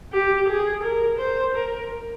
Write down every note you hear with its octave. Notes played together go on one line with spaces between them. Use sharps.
G4
G#4
A#4
C5
A#4